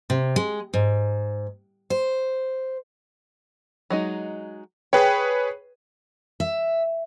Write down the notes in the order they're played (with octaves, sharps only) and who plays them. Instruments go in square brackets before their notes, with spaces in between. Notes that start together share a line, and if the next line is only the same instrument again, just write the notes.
[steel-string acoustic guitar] C3
G#3
G#2
C5
[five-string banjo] F#3 G#3 D#4
[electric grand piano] G#4 B4 C#5 [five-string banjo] G5
[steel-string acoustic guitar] E5